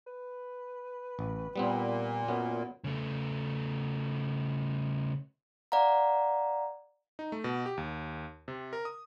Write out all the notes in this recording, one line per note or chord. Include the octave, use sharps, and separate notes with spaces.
B4
A1
A#2 G3 B3 C4
F#2 B3
C#3 A3
D5 F5 F#5 A#5
D#4
A3
B2
G4
D#2
C3
A#4
D#6